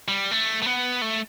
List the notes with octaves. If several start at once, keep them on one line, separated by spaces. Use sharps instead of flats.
G3
A3
A3
B3
A3